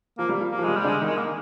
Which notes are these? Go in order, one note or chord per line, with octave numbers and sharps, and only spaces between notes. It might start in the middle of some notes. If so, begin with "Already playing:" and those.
F3 A#3
G3
F3
A#3
F3
G3 G#3
G3
D3 D4
G#3
D#3 D#4
G#3
A#3